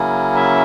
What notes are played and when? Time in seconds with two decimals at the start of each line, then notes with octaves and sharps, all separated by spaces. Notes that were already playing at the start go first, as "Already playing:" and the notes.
Already playing: C#3 F#3 A#3 C#4 E4
0.36 E5